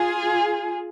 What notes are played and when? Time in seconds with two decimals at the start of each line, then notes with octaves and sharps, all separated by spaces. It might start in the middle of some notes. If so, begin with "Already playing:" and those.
Already playing: F4 G#4